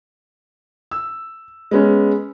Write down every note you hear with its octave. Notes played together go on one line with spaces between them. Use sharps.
E6
G#3 B3 C#4